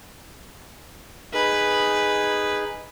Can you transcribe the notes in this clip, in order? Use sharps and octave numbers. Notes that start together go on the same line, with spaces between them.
D#4 G#4 B4